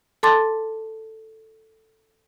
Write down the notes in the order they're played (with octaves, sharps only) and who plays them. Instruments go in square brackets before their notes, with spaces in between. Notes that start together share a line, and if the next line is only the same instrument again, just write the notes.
[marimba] A4 A5 C6 D6 A6